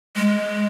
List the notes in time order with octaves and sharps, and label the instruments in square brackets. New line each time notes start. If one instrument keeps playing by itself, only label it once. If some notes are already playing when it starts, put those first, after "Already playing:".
[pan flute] G#3